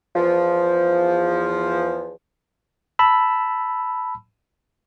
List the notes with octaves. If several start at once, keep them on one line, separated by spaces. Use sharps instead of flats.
E2 F3
A5 B5 E6